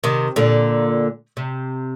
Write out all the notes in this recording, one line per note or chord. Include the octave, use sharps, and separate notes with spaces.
C3 D#3
A#2 D3
C3